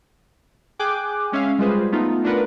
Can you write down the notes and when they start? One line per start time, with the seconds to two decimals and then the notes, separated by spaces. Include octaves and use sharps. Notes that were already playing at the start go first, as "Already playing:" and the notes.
0.79 G#4 G5 G#5 D6 F#6
1.32 G#3 C#4 E5 F5
1.58 G3 G#3 F4 G#4 B4 C5
1.92 A3 B3 D#4 F4
2.23 A3 D4 F4 A#4 B4 F#5